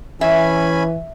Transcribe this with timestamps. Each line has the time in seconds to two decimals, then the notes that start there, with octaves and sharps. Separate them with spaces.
0.21 E3 C#4 E5 G#5 B5